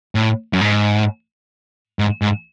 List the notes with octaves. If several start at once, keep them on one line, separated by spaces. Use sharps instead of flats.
A2
F#2
G#2
G#2
G#2